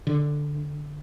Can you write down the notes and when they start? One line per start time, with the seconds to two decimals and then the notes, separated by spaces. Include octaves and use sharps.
0.07 D3